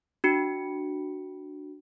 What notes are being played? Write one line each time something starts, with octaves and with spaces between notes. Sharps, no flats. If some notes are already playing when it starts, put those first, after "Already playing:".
D4 F#4 C#7